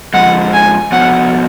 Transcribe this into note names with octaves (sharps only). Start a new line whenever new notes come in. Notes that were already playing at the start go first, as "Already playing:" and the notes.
F2 F3 G#3 F#5
G#5
F3 B3 F#4 C#5 F#5